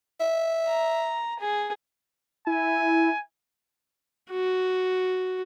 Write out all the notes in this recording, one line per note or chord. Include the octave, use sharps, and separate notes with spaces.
E5
A#5
G#4
E4 G#5
F#4